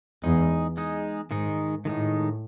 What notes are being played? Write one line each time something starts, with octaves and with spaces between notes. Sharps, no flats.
E2 G#3 D#4 G#4
G#3 D#4 G#4
G#2 D#3 G#3 D#4
A2 D#3 G#3 D#4